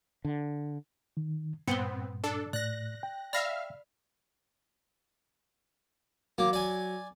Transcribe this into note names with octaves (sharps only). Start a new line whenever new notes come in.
D3
D#3
G2 A#2 B3 C4 C#7 F#7 G7
D4 A4
A2 D5 F#6 A#6 F#7
G5
D5 E5 F5 B5 F6 A#6
F#3 A#3 D6
D5 G#5